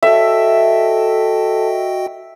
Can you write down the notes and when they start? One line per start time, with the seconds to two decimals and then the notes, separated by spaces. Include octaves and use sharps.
0.03 F#4 A4 D#5 E5 G5